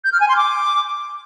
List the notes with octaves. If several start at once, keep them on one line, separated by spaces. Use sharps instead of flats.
G6
F6
G#5
C6
D6